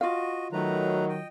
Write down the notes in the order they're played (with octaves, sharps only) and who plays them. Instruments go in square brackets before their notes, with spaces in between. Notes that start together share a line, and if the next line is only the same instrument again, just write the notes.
[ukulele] F4 F5 [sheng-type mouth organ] F#4 D#5
[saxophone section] D#3 F#3 [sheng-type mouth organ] A3 B4 A#5
[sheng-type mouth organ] D#5 G5